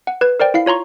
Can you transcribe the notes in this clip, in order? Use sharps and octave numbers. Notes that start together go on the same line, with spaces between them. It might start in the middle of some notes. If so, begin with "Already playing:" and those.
F#5
B4 G#6
A#4 C5 D5 G5
E4 F5 C7
F4 C#5 A#5 C6 C#6